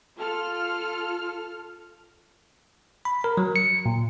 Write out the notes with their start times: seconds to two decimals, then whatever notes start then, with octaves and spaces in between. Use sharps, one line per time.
0.17 F4 A4 F6
3.05 B5
3.24 A#4
3.37 F#3
3.56 C#7
3.86 A#2